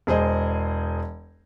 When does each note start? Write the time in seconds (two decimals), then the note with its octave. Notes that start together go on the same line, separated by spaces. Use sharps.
0.07 E1 G#4 C5 D#5